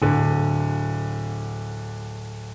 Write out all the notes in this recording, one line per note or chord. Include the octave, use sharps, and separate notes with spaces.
D1 D3